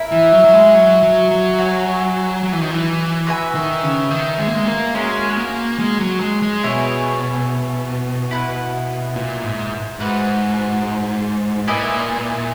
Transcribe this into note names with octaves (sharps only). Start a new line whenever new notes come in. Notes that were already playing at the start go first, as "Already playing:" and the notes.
Already playing: E4 A#4 E5
E3
F#3
F#3
G#3
F#3
F#3
F#3
F#4 C#5 G#5
F#3
E3
D#3
E3
F#4 B4 E5 G#5
D#3
C#3
D#3
G#3
A#3
G#3
A#3
G#3 C#4 F#4 A#4
A#3
G#3
F#3
G#3
G#3
B2 E4 G#4 C#5 G#5
E4 B4 F#5
A#2
G#2
G#2 F#4 B4 F#5
A#2 E4 B4 D#5 G#5